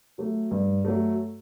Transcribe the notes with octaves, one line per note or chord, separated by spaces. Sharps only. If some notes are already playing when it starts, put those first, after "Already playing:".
F#3 A3
G2
F#3 A3